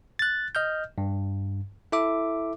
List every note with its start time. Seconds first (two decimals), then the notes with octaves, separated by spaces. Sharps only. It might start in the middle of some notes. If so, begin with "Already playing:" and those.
0.19 F#6 A6
0.55 D#5 F6 G6
0.98 G2
1.92 E4 A4 E5 D6